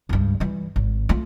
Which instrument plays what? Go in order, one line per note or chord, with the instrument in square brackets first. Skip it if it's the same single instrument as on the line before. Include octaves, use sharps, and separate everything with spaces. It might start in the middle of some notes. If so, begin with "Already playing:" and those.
[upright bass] C#2 G2
E3 G3
G#1
A3 F4